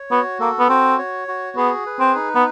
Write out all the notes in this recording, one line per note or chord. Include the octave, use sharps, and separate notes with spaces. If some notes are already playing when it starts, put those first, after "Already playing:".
Already playing: C#5
B3 F#4
A#3 A4
B3
C4 F#4
C#5
F#4
B3 G#4
B4
C4
D#4
B3